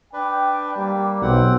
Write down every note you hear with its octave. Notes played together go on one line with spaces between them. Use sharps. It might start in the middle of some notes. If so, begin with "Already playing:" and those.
D4 B4 G5
G3 A#3
B1 C4 F#5